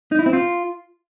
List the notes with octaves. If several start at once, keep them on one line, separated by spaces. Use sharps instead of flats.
D#4
E4
C4
F4